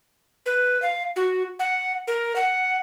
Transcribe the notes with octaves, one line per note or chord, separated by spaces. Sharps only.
B4
F5
F#4
F#5
A#4
F#5